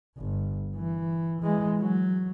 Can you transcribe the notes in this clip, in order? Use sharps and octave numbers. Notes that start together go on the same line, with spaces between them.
G1
E3
E3 G#3
F#3